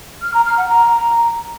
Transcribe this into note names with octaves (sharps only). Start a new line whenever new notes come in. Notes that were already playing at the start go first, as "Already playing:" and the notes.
F6
A#5
F6
F#5
A#5